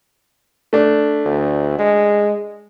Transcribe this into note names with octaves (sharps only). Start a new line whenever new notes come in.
A3 D4
D2
G#3